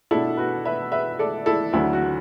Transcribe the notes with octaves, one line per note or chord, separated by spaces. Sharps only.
B2 A3 D4 E4 A4
F#4 B4
B4 E5
B4 E5
A4 D5
E4 A4
D2 D3 F#3 E4
F#4